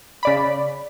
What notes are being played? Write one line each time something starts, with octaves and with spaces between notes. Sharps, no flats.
C#3 D5 B5